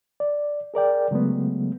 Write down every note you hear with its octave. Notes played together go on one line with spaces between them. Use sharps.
D5
G#4 A#4 D5 G5
C#3 F#3 G#3 A3 B3